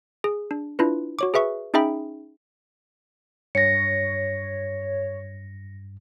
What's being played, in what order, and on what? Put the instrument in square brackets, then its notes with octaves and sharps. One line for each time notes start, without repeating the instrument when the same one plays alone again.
[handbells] G#4
D4
D4 E4 F4 B4
F#4 C#5 D6
G#4 B4 E5 C#6
C#4 D#4 G#4 E5 G5 B5
[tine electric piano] G2 [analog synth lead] C#5 [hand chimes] A#6 C#7